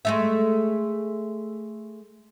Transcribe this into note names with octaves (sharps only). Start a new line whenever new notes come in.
G#3 A3 E5